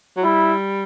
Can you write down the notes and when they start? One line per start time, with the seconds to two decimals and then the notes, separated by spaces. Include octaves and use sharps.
0.17 F#3
0.24 G3 E4